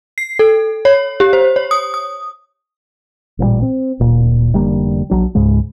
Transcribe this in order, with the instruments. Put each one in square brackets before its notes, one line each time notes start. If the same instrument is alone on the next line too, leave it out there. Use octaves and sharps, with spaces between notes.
[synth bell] C7
A4
C#5
G4
C5
C#5
D#6
D#6
[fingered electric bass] A1 A#2 D#3 G3
C4
D1 A#2
F1 D3 G3 A#3
A#1 F#3 D4
C#2 G#2 C#3 G#3